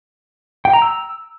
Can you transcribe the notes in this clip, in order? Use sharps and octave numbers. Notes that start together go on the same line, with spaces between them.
G5
A#5
E6